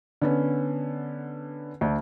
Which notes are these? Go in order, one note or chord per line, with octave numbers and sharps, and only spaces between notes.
D3 B3 C#4
D2 D4